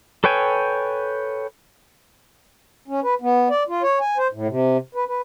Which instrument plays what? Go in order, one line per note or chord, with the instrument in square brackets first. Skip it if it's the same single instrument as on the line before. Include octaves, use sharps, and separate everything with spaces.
[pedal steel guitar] A4 B4 C#5 G5 G#5
[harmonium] C#4
B4
B3
D5
F4
C#5
G#5
C5
A2
C3
B4
B4